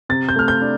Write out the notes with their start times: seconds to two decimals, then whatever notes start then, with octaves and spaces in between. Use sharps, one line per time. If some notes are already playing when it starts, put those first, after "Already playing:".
0.09 C3 A6
0.29 G6
0.36 A3 F6
0.48 G6
0.62 D4